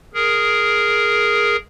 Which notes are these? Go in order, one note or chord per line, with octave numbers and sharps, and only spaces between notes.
G#4 A#4